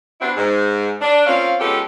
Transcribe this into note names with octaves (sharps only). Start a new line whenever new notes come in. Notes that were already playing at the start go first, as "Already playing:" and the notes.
G3 B3 C4 D4 E4 F#4
G#2
D4
A#3 C4 C#4 F4 F5
F3 G#3 B3 C#4 G4 A4